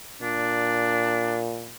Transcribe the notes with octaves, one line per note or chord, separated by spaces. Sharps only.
A#2 D4